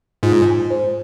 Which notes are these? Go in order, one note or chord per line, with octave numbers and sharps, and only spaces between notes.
G#2 F4
G#5
C5